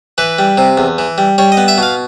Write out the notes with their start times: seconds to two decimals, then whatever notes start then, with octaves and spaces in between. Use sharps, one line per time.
0.18 E3 B4
0.39 G3
0.58 C3
0.78 E2
0.98 E3
1.18 G3
1.38 G3 C#5
1.52 D#5
1.57 B3
1.68 E5
1.78 B2 F5